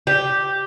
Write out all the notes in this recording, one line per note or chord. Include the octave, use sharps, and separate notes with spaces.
G4